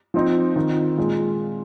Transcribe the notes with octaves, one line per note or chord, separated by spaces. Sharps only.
F3 C4 D#4
D#3 C4 F4
A#2 G#3 F4